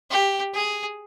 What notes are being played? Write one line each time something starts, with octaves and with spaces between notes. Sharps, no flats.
G4
G#4